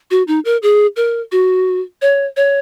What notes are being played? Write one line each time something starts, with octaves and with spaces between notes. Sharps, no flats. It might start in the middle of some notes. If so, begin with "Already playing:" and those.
F#4
D#4
A#4
G#4
A#4
F#4
C#5
C#5